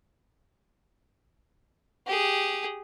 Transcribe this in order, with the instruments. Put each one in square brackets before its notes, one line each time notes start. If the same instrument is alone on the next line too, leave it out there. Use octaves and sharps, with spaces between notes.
[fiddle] G4 G#4